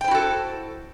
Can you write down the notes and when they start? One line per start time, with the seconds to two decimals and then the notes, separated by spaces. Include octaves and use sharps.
0.01 G5
0.04 C5
0.08 E4
0.11 F#4
0.15 A4